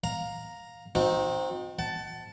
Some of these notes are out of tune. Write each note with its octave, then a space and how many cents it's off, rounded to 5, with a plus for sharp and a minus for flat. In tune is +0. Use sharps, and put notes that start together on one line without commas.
F5 +20 A#5 +0
C4 +0 D#4 +0 F#4 -40
F#5 +35 A5 +0